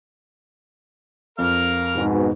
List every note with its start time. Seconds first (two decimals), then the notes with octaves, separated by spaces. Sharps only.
1.38 F2 A#4 F5
1.95 G#2 B2